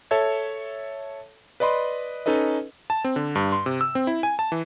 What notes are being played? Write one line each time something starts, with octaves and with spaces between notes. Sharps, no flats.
A4 C#5 E5 A5 G#6
B4 D5 D#5 B5 C6
C#4 D#4 A4 B4 D#5
A5
C4
D3
G2
C6
C3
E6
C4
E4
G#5
A5
E3